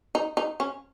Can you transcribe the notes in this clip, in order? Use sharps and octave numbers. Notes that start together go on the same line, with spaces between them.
D#4
D#4
C#4